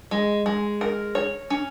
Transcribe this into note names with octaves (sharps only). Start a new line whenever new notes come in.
G#3
G#3
A#4
C#5
C#4